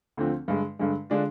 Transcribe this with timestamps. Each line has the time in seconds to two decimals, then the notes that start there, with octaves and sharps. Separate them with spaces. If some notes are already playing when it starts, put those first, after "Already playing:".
0.17 D2 D3 F3 C4
0.48 G2 D3 G#3
0.79 G2 D3 G#3
1.10 D3 G#3 D4 F4